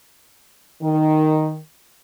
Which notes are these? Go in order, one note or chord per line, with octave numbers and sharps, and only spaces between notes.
D#3